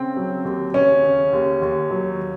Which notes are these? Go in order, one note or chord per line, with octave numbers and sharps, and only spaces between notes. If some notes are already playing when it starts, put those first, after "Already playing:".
Already playing: C#3 C4
F#3
D#2
C#3 C#4
C#3
D#2
D#2
F#3